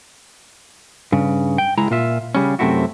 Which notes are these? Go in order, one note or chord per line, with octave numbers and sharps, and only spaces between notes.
G2 C#3
G5
C#2 G#3 E4 A#5
A#2 F4 E5
C#3 G3 C#4
F#2 C3 A3 C4 E4 F#4